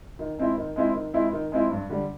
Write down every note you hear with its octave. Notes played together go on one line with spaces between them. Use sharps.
D#3
G#3 C4 E4
D#3
G#3 C4 E4
D#3
G#3 C4 E4
D#3
G#3 C4 E4
G2
D3 G3